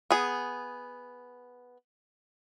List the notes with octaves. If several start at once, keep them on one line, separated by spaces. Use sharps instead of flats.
B3 G#4